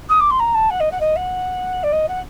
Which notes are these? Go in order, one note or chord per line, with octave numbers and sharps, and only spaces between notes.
D#6
D6
C6
A#5
A5
F#5
D#5
F#5
D#5
F#5
D5
D#5
F#5